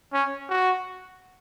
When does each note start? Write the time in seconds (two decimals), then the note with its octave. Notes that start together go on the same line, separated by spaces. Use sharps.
0.13 C#4
0.49 F#4